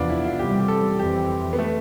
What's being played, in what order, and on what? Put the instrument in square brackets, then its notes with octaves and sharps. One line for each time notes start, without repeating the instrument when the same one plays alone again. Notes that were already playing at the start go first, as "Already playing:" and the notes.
Already playing: [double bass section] E2 C3 F3 B3 [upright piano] D4 F4
[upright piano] E4
F4
[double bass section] E2 C3 G3 C4 [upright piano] G4
[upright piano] G4
A4
[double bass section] F2 E3 G3 C4 [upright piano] G4
[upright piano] B3
A3